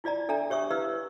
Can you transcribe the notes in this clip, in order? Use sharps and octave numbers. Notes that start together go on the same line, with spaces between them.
E4 F4 D5 D#5 A#5
D4 A4 E5 G5 A#5
G4 C#5 E5 C#6 D#6
E4 G4 B4 D#5 F5 E6